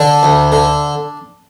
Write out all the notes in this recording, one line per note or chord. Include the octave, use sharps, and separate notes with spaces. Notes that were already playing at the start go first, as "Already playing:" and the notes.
Already playing: D3 D4
D2
D3